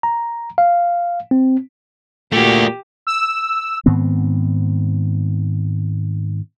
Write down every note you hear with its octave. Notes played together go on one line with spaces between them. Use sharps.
A#5
F5
C4
A#2 A3 F#4 G4
E6
G#2 D#3 B3 C4